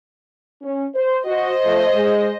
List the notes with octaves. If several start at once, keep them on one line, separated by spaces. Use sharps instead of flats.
C#4
C5
F#4 C5 D#5
F3 A3
G#3